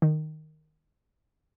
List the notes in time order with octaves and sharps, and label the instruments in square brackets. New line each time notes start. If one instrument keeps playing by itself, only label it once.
[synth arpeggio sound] D#3